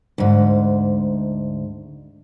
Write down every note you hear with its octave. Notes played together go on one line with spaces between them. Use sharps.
D2 G#2